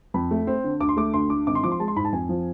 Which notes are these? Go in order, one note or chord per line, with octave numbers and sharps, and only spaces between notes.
F2 B5
A3
C4
D3
D2 D6
C6
A3 D6
D2 C6
D3 D6
G#1 D6
C6
F3 D6
C6
G#3 A5
C6
G#2 B5
A5
F2 G#5
F3